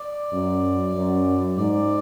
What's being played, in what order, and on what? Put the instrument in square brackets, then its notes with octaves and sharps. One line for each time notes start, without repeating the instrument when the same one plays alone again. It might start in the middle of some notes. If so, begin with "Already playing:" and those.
Already playing: [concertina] D5
[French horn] F#2
F#2
[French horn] G#2 [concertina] D5